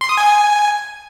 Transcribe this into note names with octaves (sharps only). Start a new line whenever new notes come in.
C6
D#6
G#5